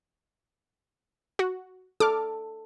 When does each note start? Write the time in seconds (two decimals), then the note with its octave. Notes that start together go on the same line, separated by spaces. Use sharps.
1.39 F#4
2.00 A4 D6 F6